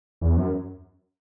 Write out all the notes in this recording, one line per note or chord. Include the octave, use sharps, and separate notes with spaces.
E2
F#2